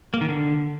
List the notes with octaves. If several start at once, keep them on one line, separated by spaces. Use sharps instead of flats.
A#3
D#3
D3